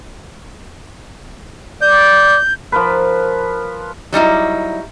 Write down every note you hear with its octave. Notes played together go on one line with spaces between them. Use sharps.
D5 G6
F3 A#4 B4
F#3 G3 D#4 E4